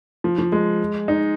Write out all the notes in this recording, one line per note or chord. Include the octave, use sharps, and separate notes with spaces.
F3
F3
G#3
D#4